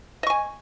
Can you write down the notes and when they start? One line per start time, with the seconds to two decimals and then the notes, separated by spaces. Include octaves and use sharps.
0.23 D#5
0.27 C#6
0.30 G#5